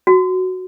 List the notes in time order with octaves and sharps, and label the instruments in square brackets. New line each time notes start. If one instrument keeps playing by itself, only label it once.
[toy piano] F#4